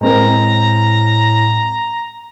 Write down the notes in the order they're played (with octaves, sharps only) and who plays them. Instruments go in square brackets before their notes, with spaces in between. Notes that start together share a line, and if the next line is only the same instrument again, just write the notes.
[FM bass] A2 [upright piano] G#3 C4 A#4 [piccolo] A#5